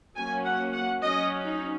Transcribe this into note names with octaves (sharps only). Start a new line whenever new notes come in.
F#3 A#3 C#4 G#5
F#5
F#5
F#3 C#4 D#5
D#4